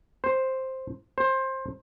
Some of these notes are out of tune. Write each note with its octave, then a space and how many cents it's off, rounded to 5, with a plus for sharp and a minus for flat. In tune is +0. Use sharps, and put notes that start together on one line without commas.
C5 +5
C5 +20